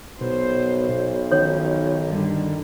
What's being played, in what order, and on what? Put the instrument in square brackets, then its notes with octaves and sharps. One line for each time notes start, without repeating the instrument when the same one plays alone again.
[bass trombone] B1 [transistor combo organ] B2 [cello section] C5
[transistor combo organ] D#3 [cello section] F3 [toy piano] C#4 C#5
[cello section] G2 D3 G3